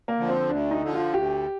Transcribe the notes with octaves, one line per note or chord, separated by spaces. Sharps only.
A#3
D3 F3
C4
D2 D4
D#4
D3 F3
F4
D2 G4